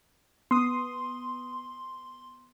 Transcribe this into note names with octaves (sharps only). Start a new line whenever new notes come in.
B3 C6 D#6